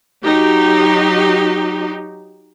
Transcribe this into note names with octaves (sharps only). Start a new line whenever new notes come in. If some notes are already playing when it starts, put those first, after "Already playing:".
F#3 D#4 G4